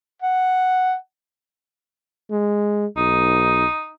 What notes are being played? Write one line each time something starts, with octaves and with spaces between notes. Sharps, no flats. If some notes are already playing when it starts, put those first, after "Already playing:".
F#5
G#3
B1 D#4